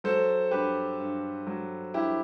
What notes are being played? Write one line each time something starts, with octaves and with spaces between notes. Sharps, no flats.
F#3 A4 C5
G2 G4 B4
G2
F#3
G2 E4 G4